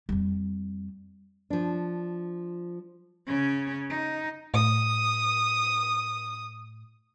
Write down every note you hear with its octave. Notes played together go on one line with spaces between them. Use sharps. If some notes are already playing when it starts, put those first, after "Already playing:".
F2 G3
F3 D4
C#3 C#4
D#4
A2 D#6